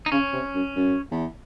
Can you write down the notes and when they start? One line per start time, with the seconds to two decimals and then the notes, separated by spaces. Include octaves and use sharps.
0.06 D#4
0.11 C#3 C#4
0.33 C3
0.54 F#2
0.75 F#2
1.11 E2